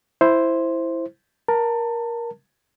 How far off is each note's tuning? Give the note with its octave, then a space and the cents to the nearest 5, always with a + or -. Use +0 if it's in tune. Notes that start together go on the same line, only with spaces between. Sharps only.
E4 +5 C5 +0
A#4 +15 A5 +25